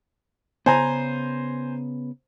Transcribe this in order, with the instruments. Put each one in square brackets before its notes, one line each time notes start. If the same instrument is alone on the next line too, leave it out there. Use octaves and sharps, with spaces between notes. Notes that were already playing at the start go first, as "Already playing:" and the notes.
[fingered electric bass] C#3 B3 [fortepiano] C5 G#5 A#5